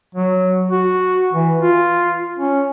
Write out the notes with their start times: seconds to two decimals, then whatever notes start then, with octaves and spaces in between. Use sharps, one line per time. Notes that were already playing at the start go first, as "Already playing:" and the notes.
0.15 F#3
0.71 F#4
1.33 E3
1.61 F4
2.38 C#4